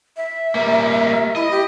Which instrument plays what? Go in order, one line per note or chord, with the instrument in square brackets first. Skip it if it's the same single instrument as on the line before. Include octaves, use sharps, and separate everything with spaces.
[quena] E5
[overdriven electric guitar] G3 A#3
[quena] E4 [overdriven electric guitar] D#5
[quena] G4